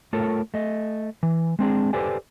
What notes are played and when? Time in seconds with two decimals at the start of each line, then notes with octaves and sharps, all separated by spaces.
0.13 A3 F4 A4 A#4 C#5
0.54 A3 D#5
1.23 E3
1.59 G#3 C4 D4 G#4
1.93 G4 A4 B4 C5 D5 G#5